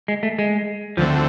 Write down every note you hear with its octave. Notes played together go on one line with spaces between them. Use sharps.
G#3
A3
G#3
D2 D3 F3 A3 C4